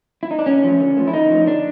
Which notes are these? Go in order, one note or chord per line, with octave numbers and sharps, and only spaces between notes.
E4
D#4
D4
D3 C#4
F3 A3
D3
F3 A3
E4
D3 D#4
F3 A3
D3 D4